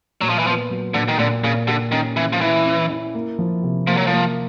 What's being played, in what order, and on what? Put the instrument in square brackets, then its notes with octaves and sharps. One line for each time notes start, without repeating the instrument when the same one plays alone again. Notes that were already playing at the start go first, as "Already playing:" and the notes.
[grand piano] A#2 [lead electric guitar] F#3
[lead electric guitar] F3
E3
[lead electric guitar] F3 [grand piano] B3
[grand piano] F#3
[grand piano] A#2 [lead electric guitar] D3
[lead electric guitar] D#3
[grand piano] A#2 [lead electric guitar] D3
[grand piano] A#2 [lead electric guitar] C#3
[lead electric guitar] D3 [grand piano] G4
[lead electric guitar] D#3 [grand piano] C#4
[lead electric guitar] E3 [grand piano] C#4
[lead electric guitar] F3
[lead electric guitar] E3 [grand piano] E4
[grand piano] C#4
E4
A#3
F3
C3
[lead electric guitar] F3 [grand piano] A#3
[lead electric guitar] F#3
F3
[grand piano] A#3